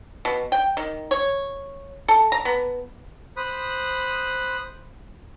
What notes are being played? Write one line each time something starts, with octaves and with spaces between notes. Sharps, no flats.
B2
G5
D#3
C#5
A4
A#5
B3
C5 B5 D#6 F#6